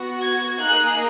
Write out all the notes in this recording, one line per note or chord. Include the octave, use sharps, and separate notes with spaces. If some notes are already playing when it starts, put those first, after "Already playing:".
Already playing: B3 F#4
G#6
A#3 D#4 G#4 F#6